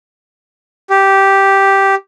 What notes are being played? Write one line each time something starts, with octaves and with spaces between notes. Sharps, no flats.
G4